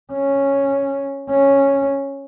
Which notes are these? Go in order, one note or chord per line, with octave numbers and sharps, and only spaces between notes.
C#4
C#4